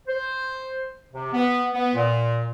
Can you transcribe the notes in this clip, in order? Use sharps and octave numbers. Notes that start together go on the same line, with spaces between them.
C5
C3
B3
B3
A#2